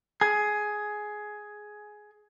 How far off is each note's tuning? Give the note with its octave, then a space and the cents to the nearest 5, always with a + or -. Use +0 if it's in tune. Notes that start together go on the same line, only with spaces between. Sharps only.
G#4 +10